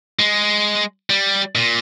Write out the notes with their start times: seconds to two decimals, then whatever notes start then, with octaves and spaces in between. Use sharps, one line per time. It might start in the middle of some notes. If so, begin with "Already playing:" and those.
0.19 G#3
1.10 G3
1.55 A#2